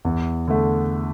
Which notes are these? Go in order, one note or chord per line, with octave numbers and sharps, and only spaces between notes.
E2
D3 A3